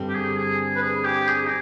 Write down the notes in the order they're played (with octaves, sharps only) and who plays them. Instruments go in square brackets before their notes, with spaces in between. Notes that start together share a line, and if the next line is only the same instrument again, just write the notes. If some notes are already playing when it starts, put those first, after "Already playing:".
Already playing: [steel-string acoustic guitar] G2 D3 G3 C4
[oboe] G4
G#4
G#4
B4
G#4
G4
G#4
D#4